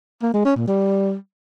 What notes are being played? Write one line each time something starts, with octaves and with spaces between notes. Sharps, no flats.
A#3
G#3
C#4
A#2
G3